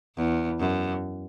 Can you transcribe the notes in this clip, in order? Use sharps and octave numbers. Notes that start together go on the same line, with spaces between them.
E2
F#2